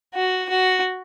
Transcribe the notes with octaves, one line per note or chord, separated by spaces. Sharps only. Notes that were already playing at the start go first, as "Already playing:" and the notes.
F#4
F#4